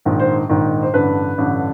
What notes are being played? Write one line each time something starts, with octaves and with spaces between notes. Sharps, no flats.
A#1 G#2 D#3
C5
A#1 G#2 D#3
C5
A1 G2 D3 B4
A1 G2 D3